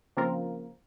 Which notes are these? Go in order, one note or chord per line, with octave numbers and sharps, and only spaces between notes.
C#3 F3 A#3 C4 F4 A#4